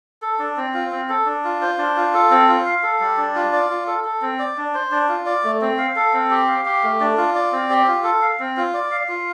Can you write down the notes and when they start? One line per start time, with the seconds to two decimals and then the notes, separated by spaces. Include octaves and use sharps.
0.22 A4
0.39 D4
0.57 C4
0.74 F4
0.92 C4
1.09 A4
1.26 D4
1.44 F4
1.61 C5
1.78 D4
1.96 F4
2.14 A4
2.30 C4
2.48 F4
2.66 F5
2.83 A4
3.00 G3
3.17 D4
3.35 F4
3.53 D5
3.70 F4
3.87 A4
4.04 A4
4.22 C4
4.39 D5
4.57 D4
4.74 C5
4.92 D4
5.09 F4
5.26 D5
5.44 A3
5.61 C4
5.78 F5
5.96 A4
6.13 C4
6.30 G4
6.48 F5
6.65 G4
6.83 A3
7.00 D4
7.17 F4
7.35 D5
7.52 C4
7.70 G4
7.88 F4
8.04 A4
8.22 F5
8.40 C4
8.57 F4
8.74 D5
8.91 F5
9.09 F4